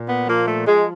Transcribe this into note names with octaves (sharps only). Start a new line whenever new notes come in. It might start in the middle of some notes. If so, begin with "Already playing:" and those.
Already playing: A#2
B3
F3 A#3
A3
F3 G#3